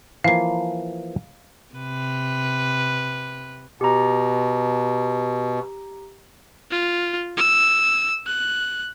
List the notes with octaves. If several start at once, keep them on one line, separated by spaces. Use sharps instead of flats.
E3 F3 A#3 F5 C7
C3 B4
B2 G4 A#5
F4
E6
F#6